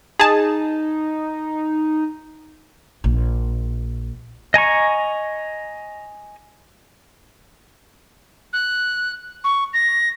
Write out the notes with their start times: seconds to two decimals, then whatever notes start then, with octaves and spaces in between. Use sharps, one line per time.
0.19 D#4 G#4 A5
3.04 A#1
4.54 D#5 G#5 A#5 C#6
8.53 F#6
9.44 C#6
9.74 A#6